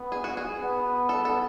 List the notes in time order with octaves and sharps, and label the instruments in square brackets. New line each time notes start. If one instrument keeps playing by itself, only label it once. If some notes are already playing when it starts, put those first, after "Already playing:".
Already playing: [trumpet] B3
[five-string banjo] G#4
F#4
G#4
[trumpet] B3
[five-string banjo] A4
A4